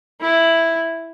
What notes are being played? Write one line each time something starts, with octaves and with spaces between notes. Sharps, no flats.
E4